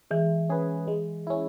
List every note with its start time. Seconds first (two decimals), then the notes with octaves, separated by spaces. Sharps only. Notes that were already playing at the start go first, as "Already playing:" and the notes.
0.11 E3 G#3
0.49 C#4 G#4 B4
0.88 G#3
1.27 C#4 E4